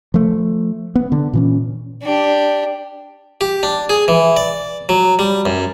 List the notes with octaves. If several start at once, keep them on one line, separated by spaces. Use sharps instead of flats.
F3 A3
B3
D3
A#2 E3 C#4
D4 G4
G4
D4
G#4
E3
D5
F#3
G3
F#2